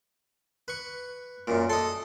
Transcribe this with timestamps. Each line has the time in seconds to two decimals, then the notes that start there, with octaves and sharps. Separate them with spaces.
0.68 B4 C#6
1.47 F#2 A#2
1.70 A4 D#5 C6